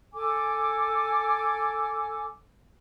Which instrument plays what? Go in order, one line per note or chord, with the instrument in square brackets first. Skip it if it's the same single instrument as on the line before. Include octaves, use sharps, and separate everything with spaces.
[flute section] A4 G#5 D6